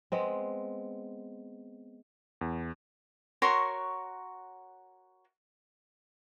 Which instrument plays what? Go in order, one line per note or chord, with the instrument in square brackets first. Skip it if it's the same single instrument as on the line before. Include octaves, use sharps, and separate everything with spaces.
[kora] G#3 B3 C4
[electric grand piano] E2
[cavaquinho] F#4 A#4 C#5 C6